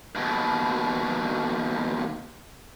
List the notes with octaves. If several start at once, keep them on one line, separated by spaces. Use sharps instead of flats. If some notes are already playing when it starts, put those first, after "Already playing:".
D#2 B2